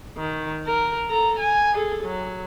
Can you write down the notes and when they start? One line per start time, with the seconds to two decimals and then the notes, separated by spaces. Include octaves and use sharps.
0.18 D#3
0.67 A#4
1.08 A4 A#5
1.39 G#5
1.74 G#4 A4
2.04 F#3